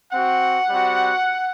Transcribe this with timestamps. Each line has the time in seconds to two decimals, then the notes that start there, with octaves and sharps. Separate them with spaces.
0.13 C4 F#4 F#5
0.69 G3 C4 F#4